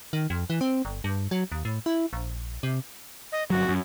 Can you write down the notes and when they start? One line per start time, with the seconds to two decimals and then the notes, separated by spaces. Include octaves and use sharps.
0.13 D#3
0.30 F2
0.50 E3
0.61 C4
0.85 G1
1.04 G2
1.31 F#3
1.52 D#2
1.65 A2
1.86 E4
2.13 A#1
2.63 C3
3.32 D#5
3.50 G1 F#3 F#4
3.69 F#2